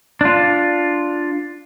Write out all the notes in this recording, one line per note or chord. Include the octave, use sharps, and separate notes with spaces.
D4 F4